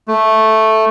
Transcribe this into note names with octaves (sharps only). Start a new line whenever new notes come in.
A3